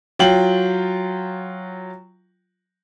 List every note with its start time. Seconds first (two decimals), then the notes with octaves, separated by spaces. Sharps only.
0.19 F#3 F4 G5 F#7